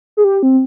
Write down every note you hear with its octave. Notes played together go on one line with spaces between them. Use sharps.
G#4
G4
C4